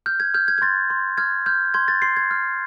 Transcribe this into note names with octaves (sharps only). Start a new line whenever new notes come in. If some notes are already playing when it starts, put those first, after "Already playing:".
F6 G6
G#6
F6 G6
G#6
G#6
C6 A6
C6
F6 G#6
F6 G6
C6 G#6
A6
C6 C7
G#6
F6